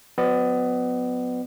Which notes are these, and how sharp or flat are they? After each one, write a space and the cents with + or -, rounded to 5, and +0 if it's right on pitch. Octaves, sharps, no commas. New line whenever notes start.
F#3 -35 B3 +25 D5 +40